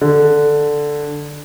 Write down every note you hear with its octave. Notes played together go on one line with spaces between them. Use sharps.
D3